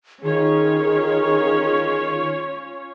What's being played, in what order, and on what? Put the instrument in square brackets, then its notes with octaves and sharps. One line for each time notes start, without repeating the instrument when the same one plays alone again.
[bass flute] D#3 [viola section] C#4 F4 C#5 [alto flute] G#4